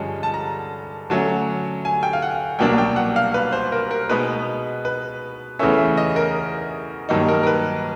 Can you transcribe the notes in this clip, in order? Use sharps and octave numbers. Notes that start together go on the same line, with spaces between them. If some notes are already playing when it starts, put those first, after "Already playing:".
Already playing: G2 D3 F3 G#3 C#4
A5
A#5
D3 F#3 A3 C#4
G#5
G5
F5
F#5
C2 B2 F#3 A#3 D4 G5
G5
F#5
F5
B4
C5
A#4
A#4
B2 G#3 B3 D#4 B4
B4
E2 C#3 E3 A3 C#4 E5
E5
D#5
A#4
G2 D#3 F#3 A#3 D#4
A#4
A#4
B4